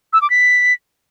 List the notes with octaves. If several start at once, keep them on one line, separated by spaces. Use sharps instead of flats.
E6
D6
B6